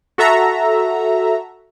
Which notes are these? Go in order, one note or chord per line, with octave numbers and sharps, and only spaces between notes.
F#4 A4 E5 A#5